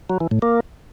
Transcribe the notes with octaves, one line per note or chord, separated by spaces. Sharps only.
F#3
E3
A2
A#3